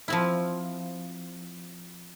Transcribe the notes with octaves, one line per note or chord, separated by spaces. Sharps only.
F3 C4 E4